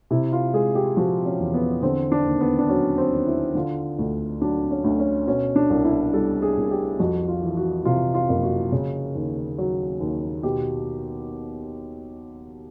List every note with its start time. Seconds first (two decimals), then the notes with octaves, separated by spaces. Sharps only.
0.11 C3 E4
0.33 F4
0.54 G#3 G#4
0.75 G4
0.97 F3 F#4
1.25 C#4
1.39 E2
1.54 B3
1.82 D3 C4
2.12 D4
2.25 D#2
2.40 B3
2.59 D4
2.69 F#3 C#4
2.98 C4
3.12 D#2
3.27 E4
3.55 D3 F4
3.99 D2
4.41 F#3 D4
4.71 C#4
4.84 D2
4.99 C#4
5.27 B2 C#4
5.56 D4
5.70 C2
5.85 E4
6.13 G3 A4
6.42 G#4
6.57 C2
6.71 G4
6.99 F2 F#4
7.28 F4
7.43 E3
7.57 F#4
7.85 C3 F4
8.14 F4
8.29 F#1
8.43 F#4
8.72 C#3
9.15 D#2
9.58 F#3
10.00 D#2
10.43 B2 G4